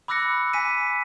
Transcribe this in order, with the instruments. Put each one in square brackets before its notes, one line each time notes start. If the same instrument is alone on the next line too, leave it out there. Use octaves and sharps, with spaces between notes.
[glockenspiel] B5 D6 E6 F#6 A#6 C#7
G#5 B6 D#7